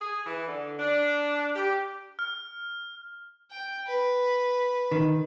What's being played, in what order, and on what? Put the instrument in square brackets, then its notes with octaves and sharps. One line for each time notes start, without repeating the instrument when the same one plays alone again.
[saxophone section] G#4
E3
D3
D4
G4
[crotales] F6
[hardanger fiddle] G5
B4
[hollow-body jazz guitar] D#3